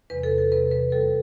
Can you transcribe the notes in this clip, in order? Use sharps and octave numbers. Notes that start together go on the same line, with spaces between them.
E2 C3 E3 G3 B4
A4
A4
E2 C3 E3 G3 B4
B4
F2 C3 G3 A4